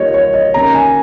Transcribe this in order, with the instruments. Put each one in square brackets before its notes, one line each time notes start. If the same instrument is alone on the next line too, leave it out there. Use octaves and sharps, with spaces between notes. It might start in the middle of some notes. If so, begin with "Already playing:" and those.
Already playing: [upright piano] D#3 G3 A#3 F4 [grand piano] C#5 D#5
[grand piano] C#5
D#5
[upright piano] D#3 A#3 C#4 [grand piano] A#5
[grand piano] G#5